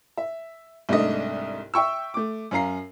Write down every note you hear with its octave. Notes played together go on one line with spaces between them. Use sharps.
E5
C2 G#2 A3 D4 D#5
E5 G5 C#6 E6
A3 D6
F#2 C#4 F5 A#5 C7